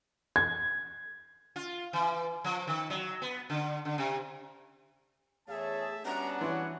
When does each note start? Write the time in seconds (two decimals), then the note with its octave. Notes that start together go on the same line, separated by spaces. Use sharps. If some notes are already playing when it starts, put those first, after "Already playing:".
0.36 G#6
1.56 F4
1.93 E3
2.44 F3
2.67 D#3
2.90 F#3
3.22 B3
3.50 D3
3.85 D3
3.98 C3
5.48 E2 A3 G#4 C#5 E5 A5
6.05 G3 B3 C#4 D4 F#4 F#5 A#5
6.41 E3 C#5 C6